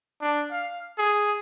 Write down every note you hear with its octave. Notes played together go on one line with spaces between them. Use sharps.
D4
F5
G#4